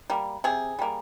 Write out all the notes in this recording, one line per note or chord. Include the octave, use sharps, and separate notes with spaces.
G3 A#3
C3 G#4
G3 A#3